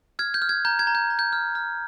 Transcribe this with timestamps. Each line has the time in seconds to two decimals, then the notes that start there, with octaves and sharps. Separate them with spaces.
0.19 F6 G#6
0.34 G6
0.42 F6
0.49 G#6
0.65 A#5 G6
0.79 G#6
0.87 A#5
0.95 G6
1.10 A#5
1.19 G6
1.33 F6
1.55 F6